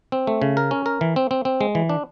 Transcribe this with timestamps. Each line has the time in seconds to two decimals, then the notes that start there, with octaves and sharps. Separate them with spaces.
0.12 C4
0.27 A3
0.42 C#3
0.57 A#4
0.71 C#4
0.86 A#4
1.01 E3
1.16 C4
1.31 C4
1.45 C4
1.61 G#3
1.75 E3
1.89 D4